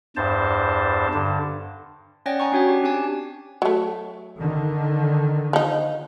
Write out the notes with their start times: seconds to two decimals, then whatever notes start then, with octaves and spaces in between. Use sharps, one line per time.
0.16 E2 G2 C5 A5
1.14 G2 D3
2.26 C#4 C#5 D5 F#5 G5 A#6
2.40 C#4 G#5 A#5 C#6
2.52 C#4 D4 F#4 C#5 G5
2.69 G4
2.83 C4 D4 G4 G#5 A5
3.62 F#3 A3
4.38 D3 D#3
5.53 F3 D#4